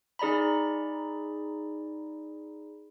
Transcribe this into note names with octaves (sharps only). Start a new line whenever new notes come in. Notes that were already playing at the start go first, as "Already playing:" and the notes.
D#4 G#4 D5 A#5 B5